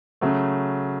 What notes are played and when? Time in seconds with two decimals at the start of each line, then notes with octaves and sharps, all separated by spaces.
0.21 C#3 F#3 A3